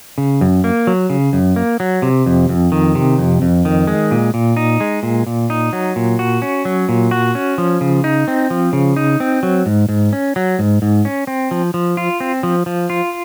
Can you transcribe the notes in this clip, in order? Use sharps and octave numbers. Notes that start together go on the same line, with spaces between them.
C#3
F#2
A#3
F#3
C#3
F#2
A#3
F#3
C3
F2
F2
D#3
C3
F2
F2
D#3
G#3
A#2
A#2
D#4
G#3
A#2
A#2
D#4
F#3
A#2
F#4
C#4
F#3
A#2
F#4
C#4
F3
C#3
D#4
C4
F3
C#3
D#4
C4
F#3
G#2
G#2
C#4
F#3
G#2
G#2
C#4
C4
F3
F3
F4
C4
F3
F3
F4